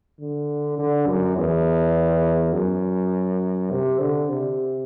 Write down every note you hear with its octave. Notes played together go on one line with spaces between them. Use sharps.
D3
D3
F#2
E2
F#2
C3
D3
C3